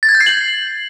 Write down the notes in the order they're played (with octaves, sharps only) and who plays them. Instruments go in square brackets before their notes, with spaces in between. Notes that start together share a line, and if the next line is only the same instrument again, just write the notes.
[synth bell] A6
G#6
G6
C7
F#7